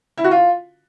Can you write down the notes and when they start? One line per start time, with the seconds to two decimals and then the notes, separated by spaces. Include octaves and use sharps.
0.18 E4
0.24 F#4
0.31 F4